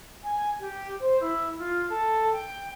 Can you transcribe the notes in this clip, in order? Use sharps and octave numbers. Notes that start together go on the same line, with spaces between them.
G#5
G4
C5
E4
F4
A4
G5